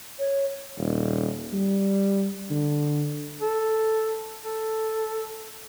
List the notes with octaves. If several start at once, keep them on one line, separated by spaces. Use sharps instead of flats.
C#5
D#1
G3
D3
A4
A4